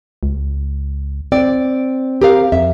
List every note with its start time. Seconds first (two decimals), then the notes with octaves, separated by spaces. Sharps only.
0.23 C#2
1.32 C4 D5
2.21 G4 A#4 F5
2.52 F2 E5